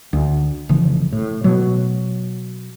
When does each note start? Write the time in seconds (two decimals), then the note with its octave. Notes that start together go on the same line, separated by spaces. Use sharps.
0.13 D2
0.69 F1 C#3 E3 F3
1.12 A2
1.44 B2 F#3